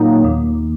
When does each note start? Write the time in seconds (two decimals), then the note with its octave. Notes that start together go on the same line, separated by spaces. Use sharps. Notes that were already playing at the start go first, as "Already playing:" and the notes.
Already playing: A#2 F#3 A#3 D#4
0.24 D#2